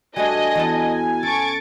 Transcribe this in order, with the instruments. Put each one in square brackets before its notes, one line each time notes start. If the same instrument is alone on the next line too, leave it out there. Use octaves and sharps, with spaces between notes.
[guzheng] G3 A3 D4 [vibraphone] F#4 [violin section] D#5 [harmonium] G#5
[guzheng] E2 A4 A5 [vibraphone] B3 E4 F#4
[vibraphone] C#4 [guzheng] A4 [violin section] C#6 A6 D7